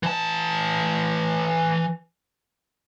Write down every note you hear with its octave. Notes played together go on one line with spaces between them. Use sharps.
E3 A5